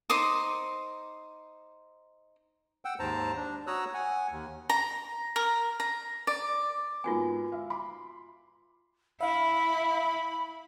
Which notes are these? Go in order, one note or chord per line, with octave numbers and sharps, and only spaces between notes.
D#4 C5 D6 D#6
F#5 G5 E6
D#2 G#2 C5 A5 A#5
D4
F#4 C#5 A#5 D#6 E6 F#6
F#5 G#5
D#2
A#5
A#4
A#5
D5
G#2 A#3 B3 F4 F#4 G#5
E5 F5
B5 C6 D6
E4 E5 F5 B5